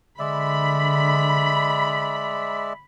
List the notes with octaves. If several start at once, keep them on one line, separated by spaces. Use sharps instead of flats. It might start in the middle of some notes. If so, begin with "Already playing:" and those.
D3 G#3 D5 E5 B5